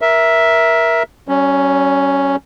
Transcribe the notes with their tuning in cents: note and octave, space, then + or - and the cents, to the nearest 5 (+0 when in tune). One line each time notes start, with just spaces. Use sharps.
A#4 +15 E5 +0
G3 -45 C#4 +0